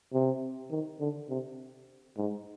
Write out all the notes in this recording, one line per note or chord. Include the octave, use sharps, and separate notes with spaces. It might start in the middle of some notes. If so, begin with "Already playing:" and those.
C3
D#3
D3
C3
G#2